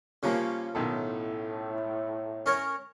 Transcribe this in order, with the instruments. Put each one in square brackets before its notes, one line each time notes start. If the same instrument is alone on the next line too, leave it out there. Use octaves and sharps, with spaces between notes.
[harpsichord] C#3 F3 [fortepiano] G3 A#3 C#4
[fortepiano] B1 D#3 A4 [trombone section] A2
[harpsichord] C#4 A#4 C#5